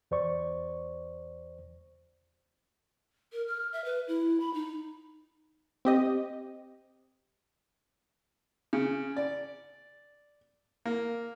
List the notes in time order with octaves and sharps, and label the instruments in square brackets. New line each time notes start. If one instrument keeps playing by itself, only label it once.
[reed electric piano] E2 C5 D5 C#6
[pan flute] A#4
F6
E5
B4
E4
B5
D#4
[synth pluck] C4 G4 D#5
[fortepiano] C#3
D5
A#3